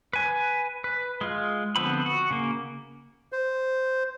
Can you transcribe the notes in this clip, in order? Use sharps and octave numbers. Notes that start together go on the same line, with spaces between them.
B4 G#5
B4
G#3 F4
D3 F3 B3 C4 B5
F#4
C#3 A#3
C5